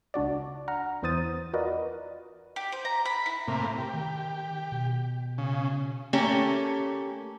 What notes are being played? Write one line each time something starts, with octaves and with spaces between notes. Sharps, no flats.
C#2 D4 F#4 D5
F#5 A#5 F6
E2 E3 C5 D#6 A6 D#7
F4 F#4 A#4 B4 D5 D#5
G4
C5
A#5
B5
E4
A2 C3 A#3
G4
D#3
B2
C#3
A3 A#3 C#4 G4